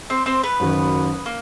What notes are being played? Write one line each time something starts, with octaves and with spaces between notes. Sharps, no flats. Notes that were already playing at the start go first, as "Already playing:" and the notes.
C4 C5
C4 C5
B3 B4
F#1 F#2 D#3
A#3